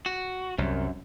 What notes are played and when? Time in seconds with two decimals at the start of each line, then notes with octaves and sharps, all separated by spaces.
0.06 F#4
0.58 C2 F#2